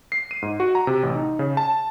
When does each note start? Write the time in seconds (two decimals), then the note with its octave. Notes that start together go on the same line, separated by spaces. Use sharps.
0.12 C7
0.31 D#7
0.42 G#2
0.60 F#4
0.75 A#5
0.87 C3
1.03 A1
1.15 D#4
1.39 C#3
1.57 A5